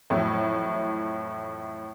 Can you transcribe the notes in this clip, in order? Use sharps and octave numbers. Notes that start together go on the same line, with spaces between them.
F2 A2 E3 F#3